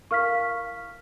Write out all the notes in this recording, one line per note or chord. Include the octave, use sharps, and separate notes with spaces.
E4 A#4 F5 C#6 F6 B6